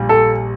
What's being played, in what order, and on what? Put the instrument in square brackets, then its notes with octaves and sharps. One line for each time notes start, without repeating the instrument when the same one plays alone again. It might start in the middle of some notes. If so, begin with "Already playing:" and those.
Already playing: [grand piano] A#1 A#2 G3
[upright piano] A4